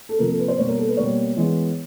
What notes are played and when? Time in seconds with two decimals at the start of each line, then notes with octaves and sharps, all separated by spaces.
0.09 A4
0.19 C3 F3 A#3 A#4
0.29 A4
0.39 B4
0.48 C5
0.58 B2 G3 A#3 C#5
0.69 A#4
0.78 A4
0.88 B4
0.97 B2 G3 A#3 C#5
1.37 E3 G#3 B3